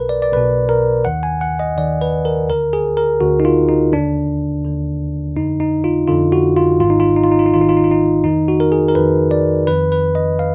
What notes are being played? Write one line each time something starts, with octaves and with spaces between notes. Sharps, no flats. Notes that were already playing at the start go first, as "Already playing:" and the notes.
Already playing: B1 B2 A#4 B4
D5
D5
B1 B2 B4
A#4
D#2 D#3 F#5
G#5
F#5
D#5
D#2 D#3 D5
B4
A#4
D2 D3 A#4
G#4
A#4
D2 D3 F#4
D#4
F4
D#4
D#2 D3 D4
D#2 D3
F2 D3 D#4
D#4
F4
F2 D3 F4
F#4
F4
G#1 G#2 D#3 F4
D#4
F4
D#4
F4
D#4
F4
D#4
G#1 G#2 D#3 F4
D#4
F4
D#4
F4
D#4
F2 D#3 D#4
F#4
A#4
G#4
A#4
F2 D#3 B4
D5
F2 D#3 B4
B4
D#5
F5